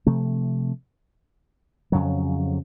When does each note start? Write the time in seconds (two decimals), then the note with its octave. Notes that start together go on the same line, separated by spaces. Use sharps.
0.06 C3 F3 A3 C4
1.92 F2 C#3 F#3